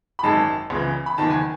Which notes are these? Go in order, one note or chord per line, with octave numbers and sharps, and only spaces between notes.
B5
G#1 F#2 D#3 G#3 A5
C#2 C#3 E3
B5
F#1 E2 D#3 A5
G#5